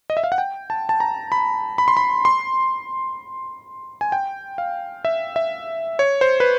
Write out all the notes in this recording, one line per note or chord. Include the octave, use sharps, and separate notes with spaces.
D#5
E5
F5
F#5
G5
A5
A5
A#5
B5
B5
C6
B5
C6
G#5
G5
F5
E5
E5
C#5
C5
B4